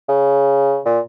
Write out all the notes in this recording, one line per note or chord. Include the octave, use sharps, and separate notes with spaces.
C#3
A#2